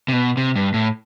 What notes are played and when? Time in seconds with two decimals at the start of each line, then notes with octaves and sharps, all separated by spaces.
0.08 C3
0.13 B2
0.37 C3
0.56 G2
0.74 A2